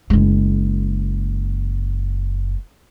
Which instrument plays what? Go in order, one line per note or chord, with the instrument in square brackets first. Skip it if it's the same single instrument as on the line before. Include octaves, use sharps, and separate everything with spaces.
[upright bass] F#1 G#3